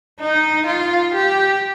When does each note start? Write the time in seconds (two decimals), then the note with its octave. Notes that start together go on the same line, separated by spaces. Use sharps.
0.20 D#4
0.66 F4
1.14 G4